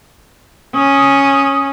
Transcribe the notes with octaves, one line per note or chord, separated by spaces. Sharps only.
C#4 D#6